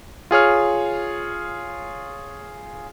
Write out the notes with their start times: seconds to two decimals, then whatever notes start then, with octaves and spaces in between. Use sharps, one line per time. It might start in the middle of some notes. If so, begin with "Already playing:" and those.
0.31 F4 G#4 C#5 F6